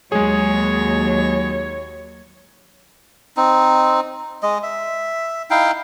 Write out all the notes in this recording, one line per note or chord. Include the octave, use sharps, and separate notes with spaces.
D#2 F#3 G#3 G#4 C#5
C4 D#4
G#3 D#5
E5
D#4 E4 F5 G5